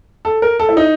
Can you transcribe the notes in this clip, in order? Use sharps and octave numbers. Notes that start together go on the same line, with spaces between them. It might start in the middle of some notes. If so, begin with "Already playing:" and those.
A4
A#4
A4
E4
D#4